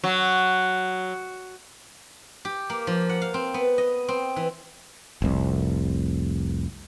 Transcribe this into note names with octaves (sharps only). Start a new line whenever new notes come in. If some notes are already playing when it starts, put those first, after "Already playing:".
F#3
G4
A#3
F3
F#5
F5
C4
B3
D#5
C4
E3
F1 C2